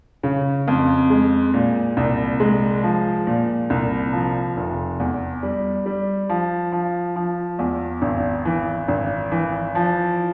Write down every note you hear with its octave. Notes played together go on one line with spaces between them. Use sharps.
C#3
F2
G#3
A#2
C2
G#3
F3
A#2
C2
F3
F1
E2
G3
G3
F3
F3
F3
E2
G#1
E3
G#1
E3
F3